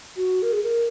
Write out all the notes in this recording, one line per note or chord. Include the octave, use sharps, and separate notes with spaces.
F#4
A#4
G#4
A#4